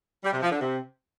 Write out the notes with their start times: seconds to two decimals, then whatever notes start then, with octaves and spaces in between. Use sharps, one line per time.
0.24 G3
0.33 C3
0.42 F3
0.51 D3
0.60 C3